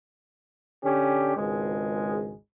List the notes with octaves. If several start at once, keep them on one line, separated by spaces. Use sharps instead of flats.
D3 C#4 G4
G#1 C#2 G#3